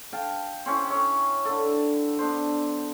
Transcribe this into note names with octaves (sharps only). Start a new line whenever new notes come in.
F5 G5 A5
C4 C#4 E4
C#5 E5
D3 A4
B3 D4 C5